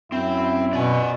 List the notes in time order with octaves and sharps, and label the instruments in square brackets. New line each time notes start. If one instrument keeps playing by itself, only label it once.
[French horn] F#2 [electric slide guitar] C4 [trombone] E4
[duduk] B2 [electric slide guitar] D5 G#5